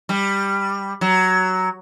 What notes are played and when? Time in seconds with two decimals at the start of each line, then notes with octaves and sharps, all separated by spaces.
0.09 G3
1.01 F#3